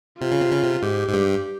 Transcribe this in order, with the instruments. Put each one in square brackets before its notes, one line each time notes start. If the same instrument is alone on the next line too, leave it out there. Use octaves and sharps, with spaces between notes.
[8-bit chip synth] C3 [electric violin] F4
[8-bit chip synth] C#3
C3
C#3
C3
[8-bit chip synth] G#2 [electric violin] G4
[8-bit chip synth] G#2
G2